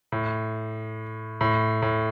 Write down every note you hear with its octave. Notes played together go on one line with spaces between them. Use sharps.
A2
A2
A2